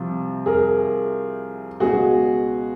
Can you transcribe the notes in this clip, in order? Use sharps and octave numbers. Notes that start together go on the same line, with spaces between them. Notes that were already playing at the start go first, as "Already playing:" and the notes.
Already playing: C2 C3 F3
G#4 A#4
C#2 B2 G#3 F#4 G#4